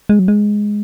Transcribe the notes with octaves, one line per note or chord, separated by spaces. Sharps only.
G#3
F#3
G#3